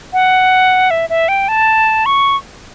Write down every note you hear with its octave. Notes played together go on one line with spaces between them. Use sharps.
F#5
E5
E5
G5
A5
C#6